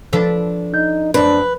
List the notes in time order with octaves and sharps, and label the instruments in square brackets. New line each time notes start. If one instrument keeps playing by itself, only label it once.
[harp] F3 D5 [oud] D4 A4 B4
[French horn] D#4 [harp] G6
[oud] F#2 C4 [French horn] D4 [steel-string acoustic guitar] B4